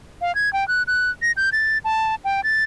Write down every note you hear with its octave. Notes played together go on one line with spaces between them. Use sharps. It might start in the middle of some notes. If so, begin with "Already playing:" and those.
F5
G#6
G5
F#6
F#6
A#6
G6
A6
A5
G5
A6